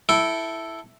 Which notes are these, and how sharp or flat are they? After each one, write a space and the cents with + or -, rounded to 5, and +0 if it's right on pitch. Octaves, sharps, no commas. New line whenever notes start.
E4 +0 A4 +0 G5 -20